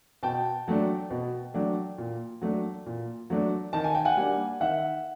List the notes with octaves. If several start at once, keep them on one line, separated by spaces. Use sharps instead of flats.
B2 G5 A5
F#3 A3 D4
B2
F#3 A3 D4
A#2
F#3 A3 D4
A#2
F#3 A3 D4
D#3 A5
G#5
G5
F#5 G#5
G3 A#3 D4
D#3 E5 F#5